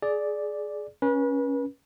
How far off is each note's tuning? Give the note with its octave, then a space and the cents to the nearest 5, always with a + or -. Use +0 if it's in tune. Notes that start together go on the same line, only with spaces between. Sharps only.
G#4 +20 D5 +0
C#4 +0 B4 -35